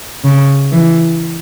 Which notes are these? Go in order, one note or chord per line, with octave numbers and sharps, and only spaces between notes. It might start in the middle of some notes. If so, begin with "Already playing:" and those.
C#3
E3